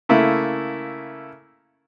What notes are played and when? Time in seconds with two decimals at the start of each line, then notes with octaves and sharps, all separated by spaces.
0.09 C#3 A3 A#3 E4